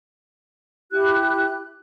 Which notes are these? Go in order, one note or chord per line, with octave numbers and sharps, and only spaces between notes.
E4 G4 F#6